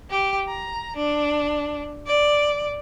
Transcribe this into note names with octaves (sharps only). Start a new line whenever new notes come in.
G4
A#5
D4
D5